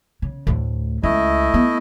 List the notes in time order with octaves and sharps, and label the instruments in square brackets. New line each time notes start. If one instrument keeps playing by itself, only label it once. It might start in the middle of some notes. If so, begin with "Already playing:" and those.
[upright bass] C#3
D2 A2
[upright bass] C#2 [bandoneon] A3 E4 D#5
[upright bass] B3